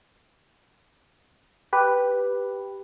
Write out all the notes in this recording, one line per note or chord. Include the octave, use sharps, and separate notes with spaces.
G4 B4